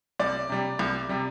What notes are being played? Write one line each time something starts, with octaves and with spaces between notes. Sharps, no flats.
C2 D5
C3 G3
C2
C3 G3